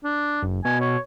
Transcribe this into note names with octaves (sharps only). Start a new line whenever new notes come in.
D4
F#1
B2 G#5
C#5